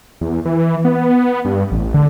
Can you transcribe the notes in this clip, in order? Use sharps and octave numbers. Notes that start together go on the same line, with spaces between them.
E2
E3
B3
G2
A1
D3